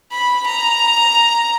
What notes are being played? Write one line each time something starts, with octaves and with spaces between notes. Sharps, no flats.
B5
A#5